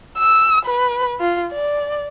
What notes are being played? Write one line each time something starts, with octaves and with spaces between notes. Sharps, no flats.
E6
B4
F4
D5